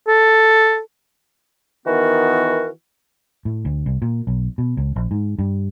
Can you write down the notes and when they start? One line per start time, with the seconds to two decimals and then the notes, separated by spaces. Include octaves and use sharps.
0.07 A4
1.86 D#3 E3 B3 F#4 A#4
3.45 A2
3.65 D2
3.86 C2
4.02 A#2
4.27 B1
4.58 B2
4.77 C#2
4.96 A#1
5.11 G#2
5.39 G2